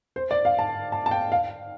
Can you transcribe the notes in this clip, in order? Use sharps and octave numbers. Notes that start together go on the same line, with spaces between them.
C5
D5
F5
A5
A5
A5
G5
F5